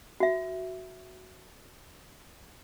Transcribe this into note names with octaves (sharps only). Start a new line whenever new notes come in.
F#4 E5